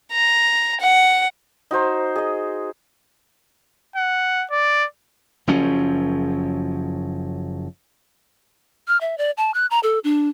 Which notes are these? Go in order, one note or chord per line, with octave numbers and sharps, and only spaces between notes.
A#5
F#5
D#4 F#4 C5 A#5
G#4 D#5
F#5
D5
F#1 F#2 F3 C#4
F6
E5
D5
A5
F#6
A#5
A4
D4